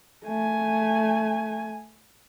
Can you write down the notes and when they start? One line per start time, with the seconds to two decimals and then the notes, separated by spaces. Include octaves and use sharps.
0.25 A3 G#5